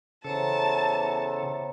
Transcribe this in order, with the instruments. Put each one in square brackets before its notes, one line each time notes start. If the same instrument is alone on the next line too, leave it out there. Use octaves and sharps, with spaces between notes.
[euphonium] E2 [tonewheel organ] C#3 A4 [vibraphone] C5 C#5 A#5 [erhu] A5